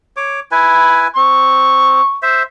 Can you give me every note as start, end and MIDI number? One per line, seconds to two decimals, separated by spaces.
0.16 0.40 73
0.16 0.40 86
0.51 1.08 64
0.51 1.08 71
0.51 1.08 80
1.16 2.01 60
1.16 2.17 85
2.22 2.43 72
2.22 2.43 76